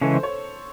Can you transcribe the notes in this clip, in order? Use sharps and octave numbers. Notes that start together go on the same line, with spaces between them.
C#3 E3 G#3 C#4 A4
C5
C#5